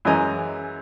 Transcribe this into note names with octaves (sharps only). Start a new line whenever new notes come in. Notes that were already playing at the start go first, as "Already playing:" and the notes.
F#2 E3 G#3 D#5 G#5 A#5